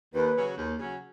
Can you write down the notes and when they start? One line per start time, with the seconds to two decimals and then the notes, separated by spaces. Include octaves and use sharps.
0.14 D#2 B4
0.36 C#3 F#3 C#4 F#4
0.57 D#2
0.78 C#3 F#3 C#4 F#4